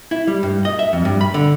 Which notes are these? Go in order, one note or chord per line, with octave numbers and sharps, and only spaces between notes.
E4
G3
G2
D#5
E5
F2
G2
B5
D3